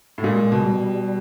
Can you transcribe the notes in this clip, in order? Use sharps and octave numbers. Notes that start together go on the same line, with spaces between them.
A2
A#2 G#3
G#3
B2
G3
G3